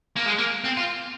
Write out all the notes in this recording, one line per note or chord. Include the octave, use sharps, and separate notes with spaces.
A#3
G#3
A#3
C4
F4